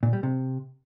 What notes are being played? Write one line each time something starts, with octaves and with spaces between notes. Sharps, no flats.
A#2
G3
C3